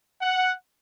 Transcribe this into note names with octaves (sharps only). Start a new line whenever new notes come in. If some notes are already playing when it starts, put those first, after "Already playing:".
F#5